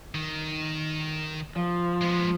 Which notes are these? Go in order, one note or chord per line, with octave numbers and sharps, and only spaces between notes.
D#3
F3
G#3 B3